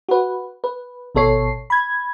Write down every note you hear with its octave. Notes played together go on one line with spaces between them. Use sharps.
F#4 B4
B4
G#1 B2 A4 C#5 C7
B5 G#6